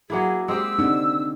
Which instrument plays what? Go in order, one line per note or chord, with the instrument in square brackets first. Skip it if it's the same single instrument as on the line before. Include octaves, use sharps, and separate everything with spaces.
[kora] F#3 A#3 E4 [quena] G#4
[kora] G#3 C4 G4 [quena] E6
[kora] D3 [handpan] C4 D#4